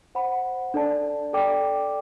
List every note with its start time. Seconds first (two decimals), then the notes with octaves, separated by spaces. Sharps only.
0.15 C5 F#5 B5
0.74 D4 A4 D5 A5
1.33 A4 D5 G5 D6